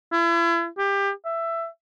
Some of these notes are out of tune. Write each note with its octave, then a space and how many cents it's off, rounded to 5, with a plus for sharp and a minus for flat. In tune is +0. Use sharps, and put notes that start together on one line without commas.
E4 +40
G4 +25
E5 +15